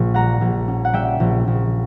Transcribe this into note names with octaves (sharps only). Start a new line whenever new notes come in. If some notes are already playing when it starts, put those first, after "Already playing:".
Already playing: A#1 A#2
G3 F#5 A#5
A#1
C#4
F#5
G3 E5 G5
A#1
A#1